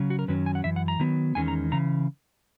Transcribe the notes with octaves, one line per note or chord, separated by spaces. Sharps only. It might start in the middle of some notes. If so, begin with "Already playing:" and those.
Already playing: C#3 F#3 C#4
F#4
A#4
F#2 D#3 F#3 C#4 B4
G#5
F#5
F#2 E3 E5
F#5
A#5
D#3 F#3 B3
E2 D#3 G#3 C#4 G#5
A#5
C#3 E3 A#5